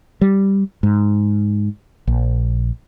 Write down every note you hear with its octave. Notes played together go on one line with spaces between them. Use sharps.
G3
G#2
A#1